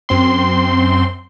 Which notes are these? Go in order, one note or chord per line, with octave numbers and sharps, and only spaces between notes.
F#2 C4 C6